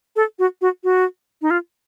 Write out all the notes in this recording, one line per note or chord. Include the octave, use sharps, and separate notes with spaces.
A4
F#4
F#4
F#4
D#4
F4